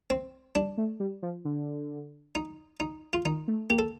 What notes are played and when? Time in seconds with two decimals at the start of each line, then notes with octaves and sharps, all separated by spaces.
0.10 C4
0.55 G3 D4
0.78 A3
1.00 G3
1.23 F3
1.45 D3
2.35 D#4
2.80 D#4
3.13 F4
3.25 D#3 D#4
3.48 A3
3.70 A#3 G4
3.79 A4